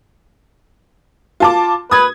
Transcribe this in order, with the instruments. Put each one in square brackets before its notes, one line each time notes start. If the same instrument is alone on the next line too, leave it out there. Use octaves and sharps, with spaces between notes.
[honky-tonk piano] F4 A5 D6
[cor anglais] B4 [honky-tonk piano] D#6 G#6